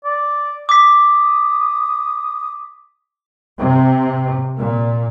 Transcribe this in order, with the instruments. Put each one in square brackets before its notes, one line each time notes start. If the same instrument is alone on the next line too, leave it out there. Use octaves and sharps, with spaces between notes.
[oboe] D5
[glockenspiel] D6 B6 [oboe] D#6
[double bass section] C3
A#2